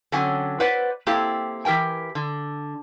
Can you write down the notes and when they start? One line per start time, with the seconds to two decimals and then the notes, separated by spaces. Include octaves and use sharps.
0.12 D3 F#3 C4 C#4 F#5 G#5
0.60 B4 C5 D5 F#5
1.07 A#3 C4 E4 G4 A4
1.65 E3 G4 A#4 G5 G#5
2.15 D3